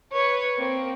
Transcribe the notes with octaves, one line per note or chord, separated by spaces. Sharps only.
B4 C#5
A#3 C4